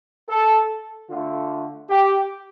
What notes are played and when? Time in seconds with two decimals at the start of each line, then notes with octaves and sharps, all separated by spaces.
0.28 A4
1.09 D3 A3 F4
1.90 G4